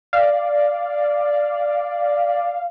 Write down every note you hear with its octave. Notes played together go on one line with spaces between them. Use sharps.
D5 F5